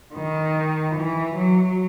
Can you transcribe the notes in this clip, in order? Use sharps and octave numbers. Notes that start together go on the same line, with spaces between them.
D#3
E3
F#3